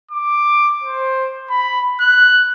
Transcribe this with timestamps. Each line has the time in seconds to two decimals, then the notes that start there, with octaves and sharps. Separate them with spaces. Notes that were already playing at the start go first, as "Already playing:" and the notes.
0.11 D6
0.83 C5
1.50 B5
2.00 F#6